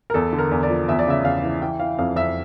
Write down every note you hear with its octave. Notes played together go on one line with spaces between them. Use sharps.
A#4
E2 A4
D3
A#4
E2
D5
F3
E2 E5
D5
C#3 E5
E2 F5
E3
E3 G5
E3 F5
F2 F5
F2 E5